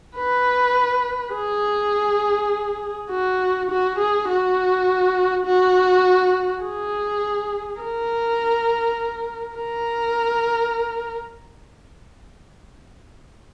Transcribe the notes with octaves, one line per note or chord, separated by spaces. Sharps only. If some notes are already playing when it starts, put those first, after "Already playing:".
B4
G#4
F#4
F#4
G#4
F#4
F#4
G#4
A#4
A#4